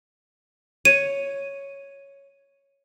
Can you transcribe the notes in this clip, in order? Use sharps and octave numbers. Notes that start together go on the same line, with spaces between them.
C#5 D#7